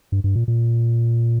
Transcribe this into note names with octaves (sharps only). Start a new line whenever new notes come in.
G2
G2
A#2
A#2